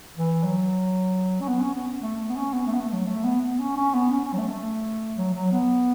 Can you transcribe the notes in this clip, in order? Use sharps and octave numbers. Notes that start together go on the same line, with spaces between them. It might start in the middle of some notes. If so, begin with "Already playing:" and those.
E3
F#3
C#4
B3
C#4
B3
A3
B3
C#4
B3
A3
B3
A3
F#3
A3
B3
B3
C#4
C#4
B3
C#4
C#4
F#3
A3
A3
F#3
F#3
B3